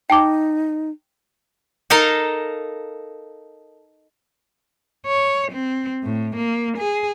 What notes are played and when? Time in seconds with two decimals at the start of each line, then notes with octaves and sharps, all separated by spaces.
0.10 D#4 G5 A5 D6
1.90 D#4 A4 A#4 D#5 F5
5.06 C#5
5.52 C4
6.04 A2
6.36 A#3
6.78 G#4